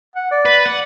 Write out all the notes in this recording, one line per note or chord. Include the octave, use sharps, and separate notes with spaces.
F#5
D5
B4
F#5